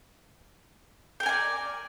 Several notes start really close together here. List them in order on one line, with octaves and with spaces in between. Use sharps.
G5 A#4 G#5 D5